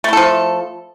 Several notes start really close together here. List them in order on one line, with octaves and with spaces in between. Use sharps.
A3 E4 A4 F3